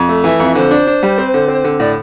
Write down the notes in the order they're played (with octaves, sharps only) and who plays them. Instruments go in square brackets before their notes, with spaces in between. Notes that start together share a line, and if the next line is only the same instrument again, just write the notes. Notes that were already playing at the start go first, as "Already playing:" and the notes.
Already playing: [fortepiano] F2
A3
[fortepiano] E3 [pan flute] E5
[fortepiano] F2
[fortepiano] D3 [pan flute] C5
[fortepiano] D4
D4
G3
C4
D3
C4
D3
[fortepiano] A2 [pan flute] D5